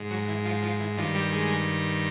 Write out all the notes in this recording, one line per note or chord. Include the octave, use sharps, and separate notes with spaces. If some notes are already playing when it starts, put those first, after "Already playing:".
Already playing: G#2
F#3
E3
F3
F3
E3
G2 D#3 F3
G3
G#3